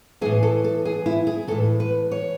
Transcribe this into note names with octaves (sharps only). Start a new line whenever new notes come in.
A2 E3 G#4
A4
A4
G#4
E4
G#4
A2 E3 A4
B4
C#5